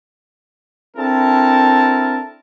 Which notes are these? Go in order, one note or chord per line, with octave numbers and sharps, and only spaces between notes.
C4 D4 E4 A4 A#4 A5